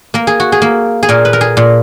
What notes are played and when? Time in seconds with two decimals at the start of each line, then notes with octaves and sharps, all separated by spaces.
0.14 A#3 A#4
0.27 G#4
0.40 F#4
0.52 G#4
0.62 A#3
1.03 G#4
1.09 A#2 A#4
1.25 B4
1.33 A#4
1.41 G#4
1.57 A#2